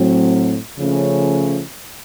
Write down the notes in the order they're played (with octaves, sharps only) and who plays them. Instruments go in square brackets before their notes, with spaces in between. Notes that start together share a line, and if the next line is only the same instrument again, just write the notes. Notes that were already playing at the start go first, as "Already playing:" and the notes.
Already playing: [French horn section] A2 F#3 C4
C#3 F3 A3 C#4